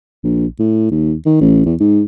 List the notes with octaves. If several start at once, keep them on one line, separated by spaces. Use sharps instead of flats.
A#1
A2
D#2
D#3
A1
E2
G#2